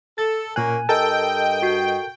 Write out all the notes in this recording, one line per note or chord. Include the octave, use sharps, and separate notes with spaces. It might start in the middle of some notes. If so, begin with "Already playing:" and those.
A4 A6
A#2 A#3 C#4 A#4 G#5 F#6
G2 A4 A#4 D#5 G5 A5 E6
F#4 C7